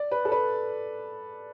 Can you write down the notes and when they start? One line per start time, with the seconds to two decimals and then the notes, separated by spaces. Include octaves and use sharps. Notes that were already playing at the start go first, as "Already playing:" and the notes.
Already playing: D5
0.11 B4
0.25 A4
0.32 B4